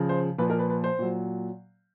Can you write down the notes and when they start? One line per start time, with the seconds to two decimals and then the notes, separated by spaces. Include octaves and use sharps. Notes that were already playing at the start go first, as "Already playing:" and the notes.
Already playing: C#3 F3
0.09 C5
0.38 A#2 F3 B4
0.50 A#4
0.59 B4
0.70 B4
0.84 C5
0.99 A#2 F#3